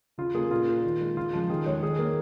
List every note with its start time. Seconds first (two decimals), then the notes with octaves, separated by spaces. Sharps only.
0.18 C#3 F4
0.35 A#3 G#4
0.51 A#2 F4 A#4
0.67 A#3
0.84 D#3
1.00 G#3
1.17 C#3 F4
1.33 F3 G#3
1.49 D#3 G#4
1.66 G#3 G#4 C#5
1.82 D#3 G#4
1.99 A#3